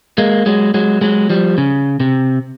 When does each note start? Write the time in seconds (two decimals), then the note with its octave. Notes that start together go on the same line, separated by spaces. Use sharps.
0.18 G#3 A#3
0.46 F#3 G#3
0.74 F#3 G#3
1.01 F#3 G#3
1.30 F3 G3
1.58 C#3
2.00 C3